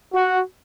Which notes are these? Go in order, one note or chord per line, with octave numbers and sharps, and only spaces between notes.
F#4